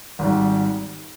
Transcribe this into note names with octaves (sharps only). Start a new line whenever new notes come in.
G#1 G#2 G3